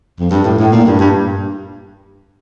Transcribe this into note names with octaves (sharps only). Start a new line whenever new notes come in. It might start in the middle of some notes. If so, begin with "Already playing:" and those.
F2
G2
A2
A2
A#2
G2
G2